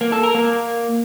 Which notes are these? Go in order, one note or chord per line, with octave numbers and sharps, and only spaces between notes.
A#3
A4
A#4
A#3